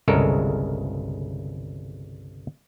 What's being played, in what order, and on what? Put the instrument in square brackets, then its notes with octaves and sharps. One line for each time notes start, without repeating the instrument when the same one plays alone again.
[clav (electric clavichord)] G1 C2 C#3 G#3 A4 A#4